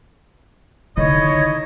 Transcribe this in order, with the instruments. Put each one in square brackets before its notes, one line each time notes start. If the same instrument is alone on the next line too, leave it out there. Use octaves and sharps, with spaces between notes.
[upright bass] D3 D#3 [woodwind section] D#4 E4 D#5 [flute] C#5